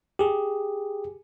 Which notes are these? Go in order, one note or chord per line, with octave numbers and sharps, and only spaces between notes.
G4 G#4